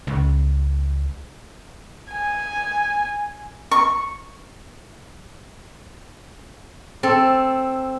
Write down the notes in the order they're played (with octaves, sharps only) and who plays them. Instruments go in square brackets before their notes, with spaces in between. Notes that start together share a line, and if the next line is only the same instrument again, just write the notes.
[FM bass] C#2
[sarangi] G#5
[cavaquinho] C#6
[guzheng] C4 A4